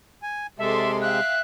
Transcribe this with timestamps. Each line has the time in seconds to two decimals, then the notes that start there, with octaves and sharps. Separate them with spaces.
0.23 G#5
0.59 C3 G#3 A4 D5 E5 C6
1.01 E5 F5 G5 F#6